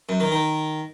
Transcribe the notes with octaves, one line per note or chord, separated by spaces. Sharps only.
F#2
D#3
D#3